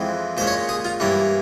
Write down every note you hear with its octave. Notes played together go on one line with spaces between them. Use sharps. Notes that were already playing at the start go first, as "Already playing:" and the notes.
Already playing: F2 E3 G#3 C4
A#2 G#3 C#4 C5
C#5
G#4
F4
G2 E3 A#3 C#4